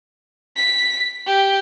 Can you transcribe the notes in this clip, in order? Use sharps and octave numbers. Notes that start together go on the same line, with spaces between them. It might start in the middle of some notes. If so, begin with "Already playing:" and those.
B6
G4